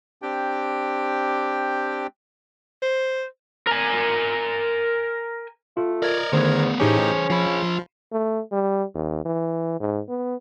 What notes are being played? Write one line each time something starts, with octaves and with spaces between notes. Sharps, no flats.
C4 D4 G4 G5
C5
A#4 G#5
A3 F4
A#4 D5 D#5 G#6
E2 D3 D#3 A3 B3 C5
A2 E3 C#4 D#4 G4 G#4 C5
F3 F4 B5
A3
G3
D#2
E3
G#2
B3